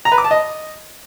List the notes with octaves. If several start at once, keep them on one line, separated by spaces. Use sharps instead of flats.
A#5
B4
D6
A5
D#5